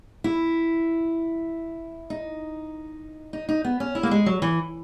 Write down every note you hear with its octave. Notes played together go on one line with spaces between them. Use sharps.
E4
D#4
D#4
D#4
B3
C#4
E4
A#3
G#3
F#3
E3